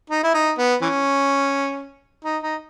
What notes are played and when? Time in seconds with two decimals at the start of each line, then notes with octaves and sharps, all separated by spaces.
0.10 D#4
0.23 E4
0.34 D#4
0.58 B3
0.81 E3 C#4
2.25 D#4
2.43 D#4